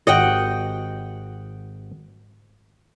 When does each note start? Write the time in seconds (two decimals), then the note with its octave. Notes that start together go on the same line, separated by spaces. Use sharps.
0.07 G#1 F#4 G4 D#5 F#5 G5